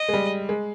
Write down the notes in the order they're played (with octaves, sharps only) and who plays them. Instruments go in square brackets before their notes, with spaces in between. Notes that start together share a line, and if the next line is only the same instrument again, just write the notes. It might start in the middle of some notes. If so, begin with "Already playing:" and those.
Already playing: [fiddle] D#5
[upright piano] G#3
G3
G#3